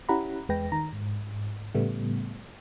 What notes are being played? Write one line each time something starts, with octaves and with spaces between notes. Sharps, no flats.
C#4 E4 G4 F#5 A#5 B5
E2 G#3 B4 G5 A#6
D#3 A#5
G#2
A2 C#3 G3 A3 B3